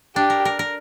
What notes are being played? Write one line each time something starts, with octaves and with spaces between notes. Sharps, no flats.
D4 G4
A#4
A#4
A#4